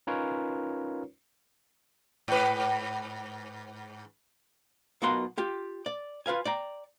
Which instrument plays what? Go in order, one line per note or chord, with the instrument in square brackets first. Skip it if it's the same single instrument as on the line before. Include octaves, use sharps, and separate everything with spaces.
[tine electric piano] C#4 D#4 F4 A#4 B4 C#5
[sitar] G#2 B4
[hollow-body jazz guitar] B1 B2 F4 A#4 F#5 C6
F4 G4
D5
F4 B4 F5 G#5
D5 G5 A#5